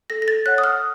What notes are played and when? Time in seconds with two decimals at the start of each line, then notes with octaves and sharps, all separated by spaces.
0.10 A4 A#6
0.22 A#6
0.28 A6
0.46 C#5 F#5 F#6
0.58 D#6
0.64 F6